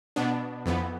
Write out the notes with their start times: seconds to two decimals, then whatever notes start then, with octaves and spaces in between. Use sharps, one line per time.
0.16 B2 B3 D4
0.66 F2 E3 B3